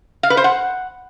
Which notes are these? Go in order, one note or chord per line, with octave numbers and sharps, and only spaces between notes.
F5
B4
C5
F#5